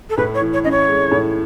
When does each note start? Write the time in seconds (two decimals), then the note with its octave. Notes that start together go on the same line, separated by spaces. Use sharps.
0.10 A4
0.17 A2 B4
0.35 C#5
0.41 E3
0.53 C#5
0.64 C#4 D#5
0.71 C#5
0.88 G#3
1.11 A2